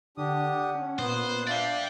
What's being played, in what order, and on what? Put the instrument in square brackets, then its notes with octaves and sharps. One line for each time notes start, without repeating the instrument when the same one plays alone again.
[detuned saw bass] D3 [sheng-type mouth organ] D4 G4 D#6 [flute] F#5
[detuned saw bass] C#4
[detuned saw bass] A#2 [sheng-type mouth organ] B3 D#6 F#6 [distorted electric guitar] C5
[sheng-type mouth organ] D4 E5 [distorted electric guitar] D5 G5 [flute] F5